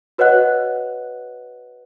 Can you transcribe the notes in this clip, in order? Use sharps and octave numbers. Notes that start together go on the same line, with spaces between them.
F#4 B4 C#5 D#5 F#5 F#6